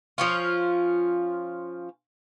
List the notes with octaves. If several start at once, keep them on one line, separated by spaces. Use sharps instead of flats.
F3 C#4 F4